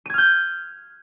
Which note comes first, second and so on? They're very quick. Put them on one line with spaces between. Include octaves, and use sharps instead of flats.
D#7 G#6 F6 G6